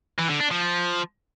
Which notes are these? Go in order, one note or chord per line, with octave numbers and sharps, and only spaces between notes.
E3
D3
D4
F3